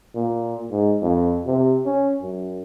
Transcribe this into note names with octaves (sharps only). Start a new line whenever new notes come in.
A#2
G#2
F2
C3
C#4
F#2